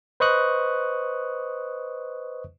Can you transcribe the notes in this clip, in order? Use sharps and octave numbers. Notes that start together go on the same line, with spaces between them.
B4 C5 D#5 C#6 D#6 F#6